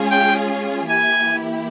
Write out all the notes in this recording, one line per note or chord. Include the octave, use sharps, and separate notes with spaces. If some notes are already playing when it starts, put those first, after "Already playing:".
Already playing: G#3 C#4 F4 G#4
G5
E3 A#3 E4 G4 G#5